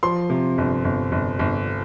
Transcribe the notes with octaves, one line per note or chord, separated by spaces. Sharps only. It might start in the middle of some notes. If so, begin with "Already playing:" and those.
F3 C6
C3
G1
G1
G1
G1